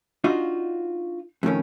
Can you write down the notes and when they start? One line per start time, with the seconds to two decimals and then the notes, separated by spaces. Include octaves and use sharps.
0.24 D4 D#4 F4 F#4 D#5 F5
1.43 F2 A2 D#3 C#4